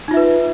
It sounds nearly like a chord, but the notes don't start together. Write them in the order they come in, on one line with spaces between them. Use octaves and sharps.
D#4 F4 E5 B4